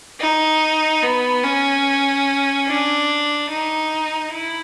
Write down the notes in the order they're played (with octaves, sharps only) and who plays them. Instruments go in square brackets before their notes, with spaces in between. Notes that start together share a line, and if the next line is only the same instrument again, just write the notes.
[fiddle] D#4
B3
C#4
D4
D#4
E4